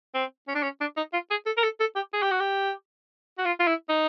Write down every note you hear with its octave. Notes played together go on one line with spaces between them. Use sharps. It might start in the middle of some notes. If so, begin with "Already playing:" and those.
C4
C#4
D4
C#4
D4
D#4
F4
G#4
A4
A#4
A4
A4
G4
G#4
G4
F#4
G4
F#4
F4
F4
E4
D#4